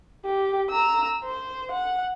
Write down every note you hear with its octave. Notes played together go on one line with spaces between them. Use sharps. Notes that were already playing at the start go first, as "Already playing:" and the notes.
G4
A#5 E6
C5
F#5